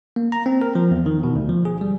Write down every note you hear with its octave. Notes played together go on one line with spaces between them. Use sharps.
A#3
A#5
C4
A#4
F3
E2
D#3
B2
D2
F3
G#4
G3